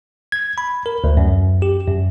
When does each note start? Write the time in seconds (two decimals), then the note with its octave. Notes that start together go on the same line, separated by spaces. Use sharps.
0.32 G#6
0.58 B5
0.86 A#4
1.04 D2
1.17 F#2
1.62 G4
1.88 F#2